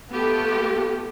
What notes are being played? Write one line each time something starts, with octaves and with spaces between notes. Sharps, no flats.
A3 B3 F4 G4 A4